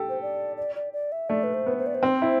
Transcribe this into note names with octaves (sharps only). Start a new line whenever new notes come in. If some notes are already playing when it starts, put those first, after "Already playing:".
Already playing: G4 A4
C5
D5
D5
D5
D5
E5
A3 D5
B4
C5
B3
C5
D5
C5
C4
E4